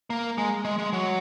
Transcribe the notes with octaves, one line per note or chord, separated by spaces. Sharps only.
A#3
G#3
G#3
G#3
F#3